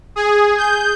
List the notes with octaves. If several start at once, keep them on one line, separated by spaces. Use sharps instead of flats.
G#4
G6